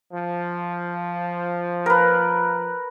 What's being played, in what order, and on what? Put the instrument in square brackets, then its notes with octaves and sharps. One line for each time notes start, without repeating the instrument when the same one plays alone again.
[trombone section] F3
[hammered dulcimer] A#4 B4